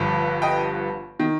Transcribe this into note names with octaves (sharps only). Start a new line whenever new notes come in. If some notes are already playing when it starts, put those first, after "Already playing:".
Already playing: G1 G2 D3 F3
D#5 G5
D#3